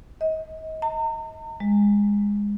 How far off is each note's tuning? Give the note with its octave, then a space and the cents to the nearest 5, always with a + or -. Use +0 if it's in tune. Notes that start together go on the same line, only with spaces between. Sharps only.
D#5 +30
A#5 -40
G#3 -20